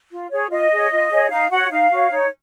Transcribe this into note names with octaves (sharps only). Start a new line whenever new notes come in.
F4
G#4 C#5
F4 D#5
G#4 C#5
F4
G#4 C#5
D#4 F5
F#4 C#5 F#5
D#4 F5
F#4 C#5
D#4 C#5